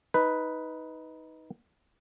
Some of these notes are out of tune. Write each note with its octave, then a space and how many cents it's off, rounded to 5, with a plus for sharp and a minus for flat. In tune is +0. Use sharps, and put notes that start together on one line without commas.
D#4 +20 B4 +0